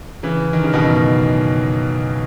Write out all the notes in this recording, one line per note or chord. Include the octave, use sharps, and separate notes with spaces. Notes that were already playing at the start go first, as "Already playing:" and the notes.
C#3 E3
D#3
C#3
B2 D#3
F#2